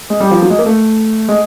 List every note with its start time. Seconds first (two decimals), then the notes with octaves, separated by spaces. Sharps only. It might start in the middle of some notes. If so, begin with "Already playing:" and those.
0.10 G#3
0.20 G3
0.31 F3
0.42 F#3
0.50 G#3
0.59 A#3
0.66 A3
1.29 G#3